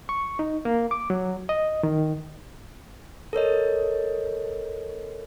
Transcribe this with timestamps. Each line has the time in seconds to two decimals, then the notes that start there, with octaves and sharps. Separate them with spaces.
0.09 C#6
0.39 D#4
0.65 A#3
0.91 D6
1.10 F#3
1.49 D#5
1.83 D#3
3.33 A4 A#4 C#5 D#5